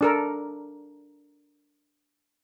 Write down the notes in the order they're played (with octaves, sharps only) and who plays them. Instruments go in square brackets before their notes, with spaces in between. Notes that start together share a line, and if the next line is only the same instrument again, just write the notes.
[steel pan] D4 A4 A#4